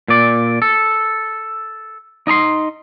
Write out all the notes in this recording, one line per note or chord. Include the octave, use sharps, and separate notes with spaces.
A#2 D5
A4
D#4 D#5 A#5 C6